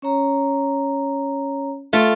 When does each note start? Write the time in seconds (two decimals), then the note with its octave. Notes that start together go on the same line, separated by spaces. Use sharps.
0.02 C#4 C#5 A#5
1.93 A3 F4